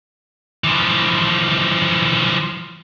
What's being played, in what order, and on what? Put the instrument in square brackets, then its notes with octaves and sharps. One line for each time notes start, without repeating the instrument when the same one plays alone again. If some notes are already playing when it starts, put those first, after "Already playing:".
[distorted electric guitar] E3 F3